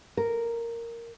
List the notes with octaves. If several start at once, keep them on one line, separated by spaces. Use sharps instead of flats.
A#4